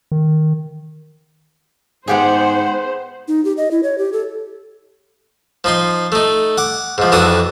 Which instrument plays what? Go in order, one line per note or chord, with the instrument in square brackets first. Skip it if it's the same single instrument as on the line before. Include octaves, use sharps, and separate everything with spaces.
[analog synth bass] D#3
[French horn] G#2 [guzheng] B3 G4 G#4 [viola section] C5 [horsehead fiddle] F#5
[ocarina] D#4
G4
D#5
E4
C#5
G4
A4
[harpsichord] F3 D#4 C6
A3 D#4
F#5 D6
G#2 F3
F2 E3 D4 F#4 D#6